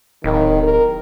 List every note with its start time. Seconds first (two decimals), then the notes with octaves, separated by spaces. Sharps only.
0.24 D1 D#3
0.63 A#4